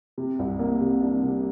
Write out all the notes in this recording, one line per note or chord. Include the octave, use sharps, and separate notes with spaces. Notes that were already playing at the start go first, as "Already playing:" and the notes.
C3
C2
A#3
C3
D4
C3